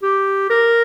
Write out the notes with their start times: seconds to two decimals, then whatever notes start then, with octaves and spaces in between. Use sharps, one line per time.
0.03 G4
0.50 A#4